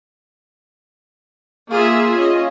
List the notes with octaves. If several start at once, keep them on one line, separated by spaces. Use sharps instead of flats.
A#3 F4 G#4 E5
C#4 D#5